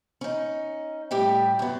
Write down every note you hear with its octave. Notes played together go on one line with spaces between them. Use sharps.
C#4 D#4
A2 G3 G4 E5 G5
F#2 B3